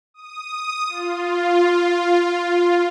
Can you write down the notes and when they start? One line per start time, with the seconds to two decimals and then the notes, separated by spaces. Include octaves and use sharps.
0.14 D#6
0.88 F4